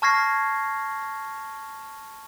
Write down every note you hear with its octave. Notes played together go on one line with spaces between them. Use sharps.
A5 C#6 F6 G#6 A#6 C7